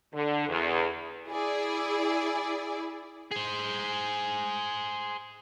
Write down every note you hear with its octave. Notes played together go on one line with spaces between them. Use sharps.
D3
E2
E4 G#4 D5
G#4 C5